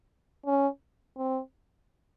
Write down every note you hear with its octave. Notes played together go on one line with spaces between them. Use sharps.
C#4
C4